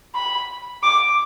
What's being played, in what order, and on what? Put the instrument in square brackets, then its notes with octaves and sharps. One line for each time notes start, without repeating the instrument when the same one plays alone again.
[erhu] B5
D6